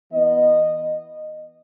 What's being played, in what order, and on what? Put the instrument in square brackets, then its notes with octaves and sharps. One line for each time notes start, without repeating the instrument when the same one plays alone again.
[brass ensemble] E3 B3 D#5